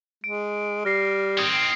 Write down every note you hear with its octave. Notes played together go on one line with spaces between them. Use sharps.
G#3 D7
G3 F6 A#6 C7
D#3 C4 D#6 G#6 C#7